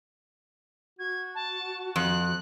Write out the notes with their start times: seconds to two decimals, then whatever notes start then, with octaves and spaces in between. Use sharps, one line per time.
0.99 F#4 G#6
1.35 A5
1.96 F2 F#6